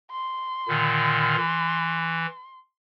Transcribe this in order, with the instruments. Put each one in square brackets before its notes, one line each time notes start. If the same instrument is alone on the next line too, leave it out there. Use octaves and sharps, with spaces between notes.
[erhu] C6
[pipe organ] A#2 D3 D#3
E3